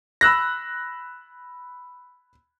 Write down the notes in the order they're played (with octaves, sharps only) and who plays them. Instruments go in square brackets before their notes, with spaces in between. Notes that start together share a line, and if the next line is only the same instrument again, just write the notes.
[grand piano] B5 E6 F#6 A#6